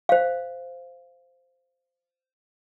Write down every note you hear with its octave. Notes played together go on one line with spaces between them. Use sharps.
C5 F5